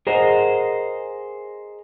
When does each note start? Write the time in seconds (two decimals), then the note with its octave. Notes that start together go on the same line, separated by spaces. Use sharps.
0.07 G#4 A#4 C5 D#5 F#5